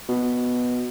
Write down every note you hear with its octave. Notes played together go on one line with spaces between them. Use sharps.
B2